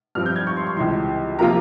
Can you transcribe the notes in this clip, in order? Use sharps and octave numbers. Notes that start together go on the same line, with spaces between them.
G2 F3 C4 F6
G6
G#6
C#6
C6
C#6
C#2 C3 E3 C6
C3 F3 A#3 F4 A#5